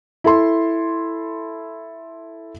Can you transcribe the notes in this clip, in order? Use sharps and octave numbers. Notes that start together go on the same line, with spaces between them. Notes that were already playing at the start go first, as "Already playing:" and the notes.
E4 A4 C6